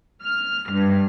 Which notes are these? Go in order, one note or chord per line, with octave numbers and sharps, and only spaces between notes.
F6
G2